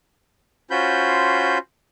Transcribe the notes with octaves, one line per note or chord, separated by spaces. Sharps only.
C#4 F4 F#4 C5 B5 G6